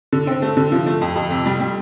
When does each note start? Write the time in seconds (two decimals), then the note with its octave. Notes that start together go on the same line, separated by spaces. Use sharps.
0.12 D3
0.27 C4
0.42 A3
0.57 D3
0.72 F3
0.87 A3
1.01 F2
1.16 F2
1.31 C3
1.46 G3
1.60 G3